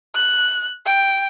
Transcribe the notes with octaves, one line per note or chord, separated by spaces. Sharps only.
F#6
G5